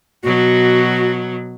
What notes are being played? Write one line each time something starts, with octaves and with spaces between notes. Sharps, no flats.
B2 F#3 F#4